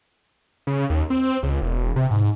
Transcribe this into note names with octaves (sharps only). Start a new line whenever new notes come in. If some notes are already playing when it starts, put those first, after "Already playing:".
C#3
D#2
C4
C#2
E1
C3
G#2